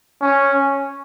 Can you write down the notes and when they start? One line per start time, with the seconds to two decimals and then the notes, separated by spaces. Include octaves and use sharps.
0.22 C#4